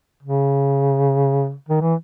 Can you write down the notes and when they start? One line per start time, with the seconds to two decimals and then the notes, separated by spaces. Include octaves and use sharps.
0.23 C#3
1.69 D#3
1.81 E3